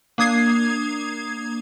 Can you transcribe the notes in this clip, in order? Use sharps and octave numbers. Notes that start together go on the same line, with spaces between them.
A#3 D4 D#6 G#6 C7